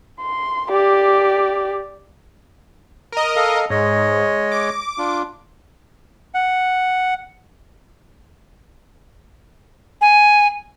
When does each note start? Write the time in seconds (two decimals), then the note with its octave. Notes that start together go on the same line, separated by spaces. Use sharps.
0.21 C6
0.70 G4 D5
3.12 A#4 D#5
3.36 A4 F5
3.70 G#2 G#3 C#5 D#5
4.52 D6
4.98 D4 F4
6.34 F#5
10.01 G#5